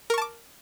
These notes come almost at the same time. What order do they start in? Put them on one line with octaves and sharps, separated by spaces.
A#4 C#6 A5 D6